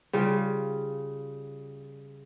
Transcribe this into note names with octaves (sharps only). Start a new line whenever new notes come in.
C#3 G3 F4